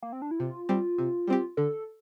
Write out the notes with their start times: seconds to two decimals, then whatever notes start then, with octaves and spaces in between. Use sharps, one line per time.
0.02 A#3
0.13 C4
0.22 D4
0.31 E4
0.39 C3 F4
0.69 G3 C4 G4
0.98 C3
1.27 G3 C4 G4
1.57 D3 A4